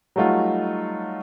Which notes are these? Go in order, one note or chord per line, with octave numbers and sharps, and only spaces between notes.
F#3 G3 A3 D#4 F4 F#4